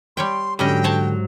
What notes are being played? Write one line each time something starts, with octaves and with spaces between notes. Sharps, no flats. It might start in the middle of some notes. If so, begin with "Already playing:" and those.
G3 C#5 G5 C6
G#2 D3 F#3 G3 C#4 D#5 G5
C5 C#5 A5